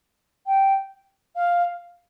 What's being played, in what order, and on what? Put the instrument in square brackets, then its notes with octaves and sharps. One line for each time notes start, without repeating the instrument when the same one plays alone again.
[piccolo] G5
F5